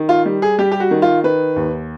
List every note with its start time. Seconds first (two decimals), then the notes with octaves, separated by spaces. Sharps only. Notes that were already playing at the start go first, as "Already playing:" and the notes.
Already playing: D#3
0.09 F4
0.26 G3
0.42 G#4
0.59 G3 G4
0.72 G4
0.80 F#4
0.91 D#3
1.02 F4
1.24 D#3 B4
1.56 D#2